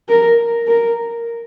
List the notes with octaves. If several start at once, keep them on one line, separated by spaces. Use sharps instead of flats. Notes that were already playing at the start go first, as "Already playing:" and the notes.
A#4
A#4